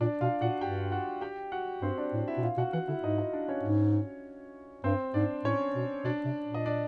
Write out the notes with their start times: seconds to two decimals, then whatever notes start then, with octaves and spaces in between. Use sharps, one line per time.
0.01 A#2 D4 D5
0.21 B2 F4 F5
0.41 A#2 F#4 F#5
0.61 G2 G4 G5
0.92 F#4 F#5
1.21 G4 G5
1.52 F#4 F#5
1.82 G2 C4 C5
1.98 D4 D5
2.13 A2
2.28 E4 E5
2.37 B2
2.43 A#2 F4 F5
2.57 B2 F#4 F#5
2.73 E3 F#4 F#5
2.88 D3 E4 E5
3.03 G#2 D#4 D#5
3.18 D#4 D#5
3.33 D4 D5
3.48 C#4 C#5
3.63 G#2
4.84 G2 C4 C5
5.14 G#2 D4 D5
5.44 A2 C#4 C#5
5.75 B2
6.05 B2 D4 D5
6.25 C3
6.46 A#2
6.54 D#5
6.66 D4 D5